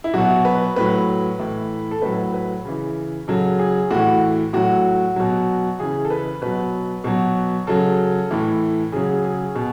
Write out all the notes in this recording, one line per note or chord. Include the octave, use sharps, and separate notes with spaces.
E4
B2 F#3 F#4
B4
A2 F#3 B4
A2 E3
A4
A2 F#3 B4
B4
C#3 E3
C#3 F#3 A4
G#4
A2 E3 F#4
A2 F#3 F#4
B2 F#3
C#3 E3 G#4
A4
B4
B2 F#3 B4
B2 F#3
C#3 F#3 A4
A2 E3
C#3 F#3 G#4
G#4
B2